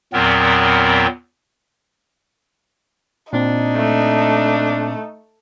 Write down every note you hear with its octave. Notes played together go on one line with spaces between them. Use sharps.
E2 A#2 F#3 B3 C4 A#4
A#2 C4 D4 D#4
A3